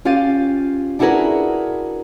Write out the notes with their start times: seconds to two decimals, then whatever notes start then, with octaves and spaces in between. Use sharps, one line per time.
0.05 C#4 F4 G4 F5 A6 D#7
0.99 D4 E4 F#4 G#4 A#4 B4